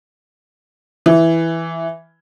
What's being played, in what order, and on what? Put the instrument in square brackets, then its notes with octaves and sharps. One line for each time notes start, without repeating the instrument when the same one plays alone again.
[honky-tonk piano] E3